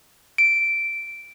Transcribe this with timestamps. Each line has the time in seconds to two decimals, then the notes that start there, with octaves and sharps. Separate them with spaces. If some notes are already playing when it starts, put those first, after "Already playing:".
0.38 D7